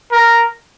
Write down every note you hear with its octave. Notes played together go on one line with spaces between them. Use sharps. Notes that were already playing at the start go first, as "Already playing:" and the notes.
A#4